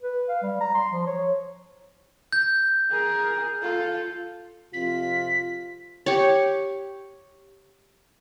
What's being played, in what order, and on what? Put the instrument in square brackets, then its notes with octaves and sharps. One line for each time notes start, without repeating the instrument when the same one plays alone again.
[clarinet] B4
F5
G3
A#5
C6
F3
C#5
[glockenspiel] G6
[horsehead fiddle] G#4 A#4
F4 A4
[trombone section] F2 C3 F4 [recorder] B6
[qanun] G4 C#5